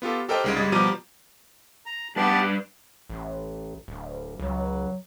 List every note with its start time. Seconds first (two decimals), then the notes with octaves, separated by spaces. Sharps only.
0.02 B3 F4 G4 A4
0.29 G4 A4 A#4 C5 D#5 G5
0.44 C2 C#3 G#3 D#4 D7
0.56 G1 G3 G#3 D#6 G#6 A6
0.72 B2 F3 G3 A#5 D6 D#7
1.86 A#5
2.16 G2 B3 G4 B4 D5 A5
3.10 A1
3.88 D1
4.40 C#2 F#3